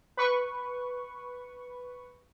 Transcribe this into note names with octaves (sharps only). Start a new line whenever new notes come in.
B4 C#6